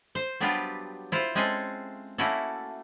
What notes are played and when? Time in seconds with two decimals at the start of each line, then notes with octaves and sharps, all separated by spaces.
0.15 C5
0.40 F#3 G3 B3 D4 F4 G4
1.12 E4 F4 C5
1.35 G#3 C4 C#4 G#4 A4
2.18 A3 A#3 C#4 E4 F#4 A4